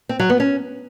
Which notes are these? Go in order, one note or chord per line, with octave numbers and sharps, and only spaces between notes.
C4
F#3
B3
C#4